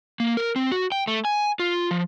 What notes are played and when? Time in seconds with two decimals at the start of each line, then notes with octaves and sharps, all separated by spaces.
0.20 A#3
0.37 A#4
0.56 C4
0.71 F#4
0.92 G5
1.07 A3
1.25 G#5
1.59 F4
1.91 F3